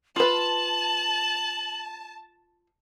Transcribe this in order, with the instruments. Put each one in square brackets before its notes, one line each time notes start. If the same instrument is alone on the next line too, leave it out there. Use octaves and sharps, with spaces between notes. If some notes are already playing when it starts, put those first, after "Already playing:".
[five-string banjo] F4 B4 [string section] A5 [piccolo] F#7